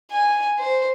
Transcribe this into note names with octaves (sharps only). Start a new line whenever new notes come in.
G#5
C5